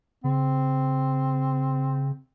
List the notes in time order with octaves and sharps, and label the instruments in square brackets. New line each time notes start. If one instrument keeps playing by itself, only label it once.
[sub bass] C#3 [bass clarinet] C4